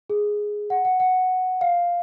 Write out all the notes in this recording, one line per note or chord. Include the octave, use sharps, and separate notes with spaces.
G#4
F#5
F#5
F#5
F5